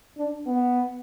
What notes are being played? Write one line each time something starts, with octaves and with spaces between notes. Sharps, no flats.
D4
B3